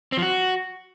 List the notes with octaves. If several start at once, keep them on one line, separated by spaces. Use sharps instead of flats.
C4
F3
F#4